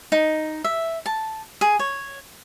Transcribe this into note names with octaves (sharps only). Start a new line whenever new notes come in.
D#4
E5
A5
G#4
C#5